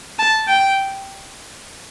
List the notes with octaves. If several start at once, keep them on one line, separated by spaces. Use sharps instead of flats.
A5
G5